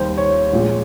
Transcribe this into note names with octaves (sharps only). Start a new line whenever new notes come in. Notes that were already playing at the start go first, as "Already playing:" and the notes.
Already playing: D#2 D#3 G3 C5
C#5
A#1 A#2 G#3